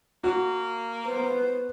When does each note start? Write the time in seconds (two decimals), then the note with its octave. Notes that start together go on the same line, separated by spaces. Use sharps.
0.24 A#3 F#4
1.06 B3 B4 C5